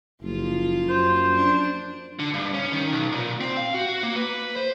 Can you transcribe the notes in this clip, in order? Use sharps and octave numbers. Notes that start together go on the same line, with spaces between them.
F#1 F3 A#3 F4
F#2 C5
D4
D3
G2
C#4
D#3
B1
A#2
C4
F5
F#4
A#3
B4
C5